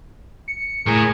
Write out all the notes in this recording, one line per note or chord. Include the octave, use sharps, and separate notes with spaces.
C#7
A2 G#4 A#4